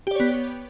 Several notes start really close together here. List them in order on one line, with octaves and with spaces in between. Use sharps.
G4 D5 C#5 B3